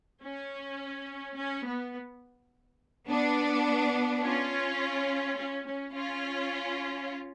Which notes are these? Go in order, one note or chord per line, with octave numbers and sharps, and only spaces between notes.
C#4
C#4
B3
B3 D4
C#4 F4
C#4
C#4
C#4 F4